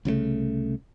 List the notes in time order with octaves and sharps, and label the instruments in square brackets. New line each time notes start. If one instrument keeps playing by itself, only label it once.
[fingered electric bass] C2 C#3 F#3 A3